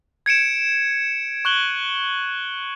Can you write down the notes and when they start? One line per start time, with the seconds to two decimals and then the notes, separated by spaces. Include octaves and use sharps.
0.26 G#6 C#7 D7 E7
1.45 C#6 F#6 F#7 G7